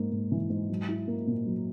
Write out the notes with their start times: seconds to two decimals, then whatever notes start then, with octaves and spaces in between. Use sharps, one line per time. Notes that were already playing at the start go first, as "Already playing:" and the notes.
Already playing: G#2 A#3
0.12 G#2
0.32 E3
0.50 G#2
0.70 F#3
0.88 E4
1.08 A#3
1.27 A#2
1.46 F#3